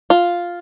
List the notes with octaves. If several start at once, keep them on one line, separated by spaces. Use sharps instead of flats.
F4